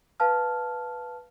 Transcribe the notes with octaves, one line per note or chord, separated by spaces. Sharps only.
B4 F5 A5 F6